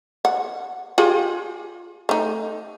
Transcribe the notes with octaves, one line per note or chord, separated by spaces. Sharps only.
F#5
F4 G4 G#4
A3 D#4